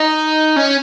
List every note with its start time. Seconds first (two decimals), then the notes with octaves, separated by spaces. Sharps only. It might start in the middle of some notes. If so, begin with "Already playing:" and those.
Already playing: D#4
0.56 C#4